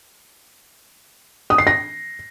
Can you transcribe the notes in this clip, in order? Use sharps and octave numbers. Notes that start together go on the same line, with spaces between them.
D#6
C7
A#6